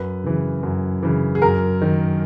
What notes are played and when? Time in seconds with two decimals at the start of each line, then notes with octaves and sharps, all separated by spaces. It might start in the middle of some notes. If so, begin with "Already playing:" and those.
Already playing: F#2 B4
0.24 C#3 E3
0.63 F#2
1.03 C#3 E3
1.35 G#4
1.42 F#2 A#4
1.82 D#3